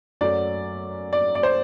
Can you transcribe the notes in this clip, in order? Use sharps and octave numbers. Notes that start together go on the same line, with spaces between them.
F#2 F#3 A3 D5
D5
D5
C5